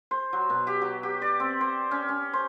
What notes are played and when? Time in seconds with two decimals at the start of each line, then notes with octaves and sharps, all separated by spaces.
0.11 C5
0.33 F#3
0.50 B2
0.67 G4
0.82 F#3
1.03 G4
1.22 D5
1.40 C4
1.61 C5
1.91 C#4
2.09 C#4
2.33 C5